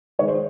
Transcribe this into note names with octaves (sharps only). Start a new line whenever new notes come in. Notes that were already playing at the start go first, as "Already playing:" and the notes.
D#3 G#3 C#5
C5